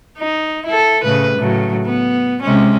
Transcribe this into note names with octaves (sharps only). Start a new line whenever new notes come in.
D#4
E4 A4
A2 C#3 B4
A2 C#3 F#3
B3
C3 G#3 C#4